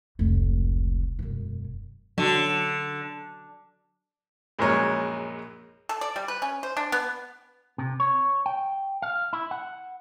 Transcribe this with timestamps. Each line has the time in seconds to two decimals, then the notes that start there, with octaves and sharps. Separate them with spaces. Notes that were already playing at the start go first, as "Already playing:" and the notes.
0.19 F1 C#2
1.19 E1 F#2
2.18 D3 F#3
4.59 A#1 F#2 G#3 A#4 C#5
5.89 A4
6.01 D5
6.16 G3
6.28 B4
6.42 C#4
6.63 C5
6.77 D4
6.92 B3
7.78 C3
8.00 C#5
8.46 G5
9.02 F5
9.33 E4
9.51 F#5